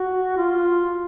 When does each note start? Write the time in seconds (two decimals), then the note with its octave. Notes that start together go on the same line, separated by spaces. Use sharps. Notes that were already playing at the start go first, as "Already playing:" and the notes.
Already playing: F#4
0.37 F4